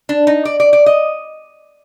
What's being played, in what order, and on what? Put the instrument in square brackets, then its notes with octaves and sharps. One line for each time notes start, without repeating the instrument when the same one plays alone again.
[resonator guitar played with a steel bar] D4
D#4
D5
D5
D5
D#5